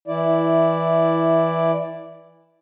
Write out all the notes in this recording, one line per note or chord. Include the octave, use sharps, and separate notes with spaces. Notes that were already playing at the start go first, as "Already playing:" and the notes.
E3 E4 D5